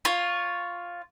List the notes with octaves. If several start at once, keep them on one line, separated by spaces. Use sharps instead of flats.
F4 C#5